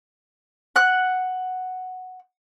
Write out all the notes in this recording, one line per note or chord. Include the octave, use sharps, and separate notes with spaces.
F#5 F#6